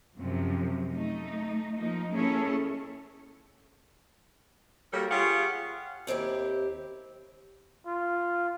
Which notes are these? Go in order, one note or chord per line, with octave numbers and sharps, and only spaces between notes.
F#2 C3 F3
A3 D#4
F3 A#3 D#4
A#3 C#4 E4 G#4 A4 C#5
G3 A#3 F#4 A4 A#4 C#5
F4 G4 G#4 C#5 F5 F#5
D#2 C4 E4 G4
F4